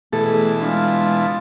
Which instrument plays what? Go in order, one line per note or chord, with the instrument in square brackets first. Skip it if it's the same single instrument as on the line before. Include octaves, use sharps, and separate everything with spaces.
[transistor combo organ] B2 E3 A5 [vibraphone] A3 G#4 [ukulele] A4
[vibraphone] G#3 [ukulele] D4 [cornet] F4